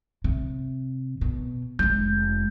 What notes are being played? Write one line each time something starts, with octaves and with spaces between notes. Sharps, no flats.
C3
B2
F1 G#3 G6